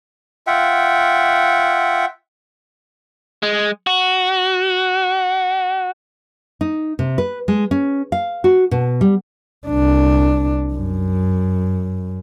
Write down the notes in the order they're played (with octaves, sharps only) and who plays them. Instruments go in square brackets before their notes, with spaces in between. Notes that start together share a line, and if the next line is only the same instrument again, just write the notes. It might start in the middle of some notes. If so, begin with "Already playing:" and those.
[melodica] F4 E5 F#5 G5
[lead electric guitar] G#3
F#4
[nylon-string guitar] D#4
C3
B4
G#3
C#4
F5
F#4
B2
G3
[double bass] C2 D4
F#2